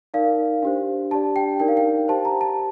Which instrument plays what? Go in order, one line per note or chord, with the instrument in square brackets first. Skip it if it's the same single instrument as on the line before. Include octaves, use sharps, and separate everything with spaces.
[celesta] D#4 A#4 D5 F5
D4 G4 C5
D4 G4 D5 A5
G5
D#4 A#4 D5 G5
F5
G5
G4 C5 A5
A#5
A5